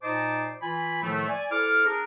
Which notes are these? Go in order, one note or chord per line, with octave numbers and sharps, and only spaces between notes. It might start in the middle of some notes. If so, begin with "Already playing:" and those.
A#2 D#4 C5 D#5 A5 D6
E3 F4 G#5 B5
A2 D#3 F3 A3
D5 G#5
E4 A4 C5 D6 F6
D4 G#4 A#4